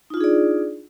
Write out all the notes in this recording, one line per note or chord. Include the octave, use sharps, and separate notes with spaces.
D4 D#4 F4 G#4 D5